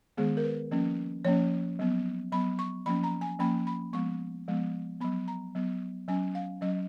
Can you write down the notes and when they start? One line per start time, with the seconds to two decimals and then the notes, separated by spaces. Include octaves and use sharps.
0.17 D#3 G#3 B3 G#4
0.37 A#4
0.44 B4
0.71 F3 A#3 C#4
1.25 F3 A#3 C#4 C#5
1.79 F#3 B3
2.32 F#3 B3 B5
2.59 C#6
2.86 F3 A#3 C#4 B5
3.04 A#5
3.21 G#5
3.39 F3 A#3 C#4 B5
3.67 B5
3.93 F3 G#3 B3 C#6
4.48 F3 G#3 B3
5.01 B3 B5
5.04 F#3
5.28 A#5
5.55 F#3 B3
6.08 F#3 C#4 G#5
6.35 F5
6.61 F#3 C#4 D#5